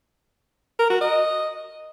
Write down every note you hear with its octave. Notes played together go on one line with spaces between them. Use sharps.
A#4
F#4
D#5